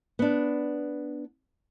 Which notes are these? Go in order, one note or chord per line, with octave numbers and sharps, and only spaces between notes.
B3 D4